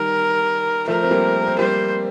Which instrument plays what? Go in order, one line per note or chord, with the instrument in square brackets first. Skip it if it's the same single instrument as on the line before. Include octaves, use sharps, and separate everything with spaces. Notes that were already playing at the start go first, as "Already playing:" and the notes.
Already playing: [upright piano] D#3 G3 [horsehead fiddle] A#4
[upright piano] F3 A3 [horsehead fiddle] A#4
[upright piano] C4
G3 A#3
C4
[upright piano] G3 A#3 [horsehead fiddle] C5